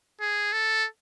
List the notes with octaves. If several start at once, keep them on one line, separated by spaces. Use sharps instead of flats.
G#4
A4